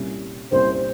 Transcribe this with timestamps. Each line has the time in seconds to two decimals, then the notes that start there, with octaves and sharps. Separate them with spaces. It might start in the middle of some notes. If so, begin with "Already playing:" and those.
Already playing: C2 A#2 G3 C#4 E4
0.51 C2 A#2 G3 C#4 E4 C5